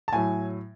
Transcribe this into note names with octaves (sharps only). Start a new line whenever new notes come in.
A5
A2 F#3 G#5